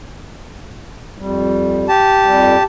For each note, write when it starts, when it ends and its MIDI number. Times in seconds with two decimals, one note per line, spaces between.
1.18 1.87 41
1.18 1.87 55
1.88 2.63 67
1.88 2.63 81
2.25 2.56 41
2.25 2.56 55